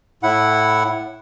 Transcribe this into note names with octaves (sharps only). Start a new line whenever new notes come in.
A2 E4 F#5